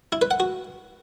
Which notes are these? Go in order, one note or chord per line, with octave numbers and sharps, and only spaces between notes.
E4
B4
F#5
F#4